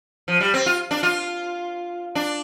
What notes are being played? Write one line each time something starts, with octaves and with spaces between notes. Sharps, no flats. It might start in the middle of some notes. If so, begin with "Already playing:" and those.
F3
G3
C4
F4
D4
F4
D4